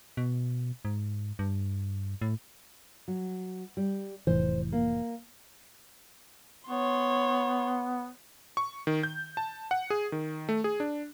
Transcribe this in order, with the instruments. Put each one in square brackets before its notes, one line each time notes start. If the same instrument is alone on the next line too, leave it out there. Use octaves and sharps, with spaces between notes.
[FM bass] B2
G#2
G2
A2
[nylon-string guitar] F#3
G3
[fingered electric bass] F1 A2 E3 [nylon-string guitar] C5
[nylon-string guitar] A#3
[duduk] B3 [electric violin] C#5 C6
[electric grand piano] C#6
D#3
G6
A5
F#5
G#4
D#3
A3
G#4
D4